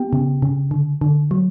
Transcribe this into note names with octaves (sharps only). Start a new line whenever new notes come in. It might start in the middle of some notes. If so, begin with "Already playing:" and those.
Already playing: B3 G4 G5
C#3
C#3
D3
D3
F#3